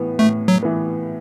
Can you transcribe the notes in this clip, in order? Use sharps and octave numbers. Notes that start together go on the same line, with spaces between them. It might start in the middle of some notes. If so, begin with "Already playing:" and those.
Already playing: A2 E3 B3
A2 A3
F#3
E3 B3